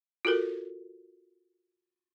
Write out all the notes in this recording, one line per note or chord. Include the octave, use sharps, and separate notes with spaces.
F4 F#4 A4 A#4